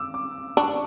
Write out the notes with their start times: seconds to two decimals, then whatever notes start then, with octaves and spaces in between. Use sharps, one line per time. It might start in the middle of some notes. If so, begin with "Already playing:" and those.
Already playing: D6 E6
0.14 D6
0.57 D4 C#6